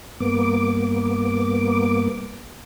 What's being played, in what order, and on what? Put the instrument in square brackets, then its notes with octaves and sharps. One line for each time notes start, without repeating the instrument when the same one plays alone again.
[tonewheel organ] G2 A#3 B3 D6